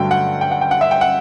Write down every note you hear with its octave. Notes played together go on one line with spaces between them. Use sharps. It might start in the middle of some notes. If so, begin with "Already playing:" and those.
Already playing: G2 D3 F#3 A3 G5
F#5
G5
F#5
G5
F#5
E5
G5
F#5